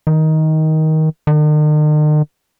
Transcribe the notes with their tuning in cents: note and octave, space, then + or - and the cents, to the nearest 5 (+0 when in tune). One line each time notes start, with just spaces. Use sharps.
D#3 +15
D#3 -45